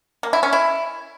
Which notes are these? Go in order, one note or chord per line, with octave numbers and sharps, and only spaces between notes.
A#3
E4
C#4
E4